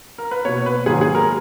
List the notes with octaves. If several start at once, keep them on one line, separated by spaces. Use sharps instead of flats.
A#4
B4
B2 A#3 C#5
B4
G#2 D#3 F#3 A#3 G#4
G#4
A#4